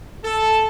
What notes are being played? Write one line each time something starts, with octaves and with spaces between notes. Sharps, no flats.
A4